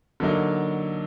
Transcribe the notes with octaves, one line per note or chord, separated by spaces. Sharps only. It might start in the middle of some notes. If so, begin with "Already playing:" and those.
D3 F#3 A#3 D#4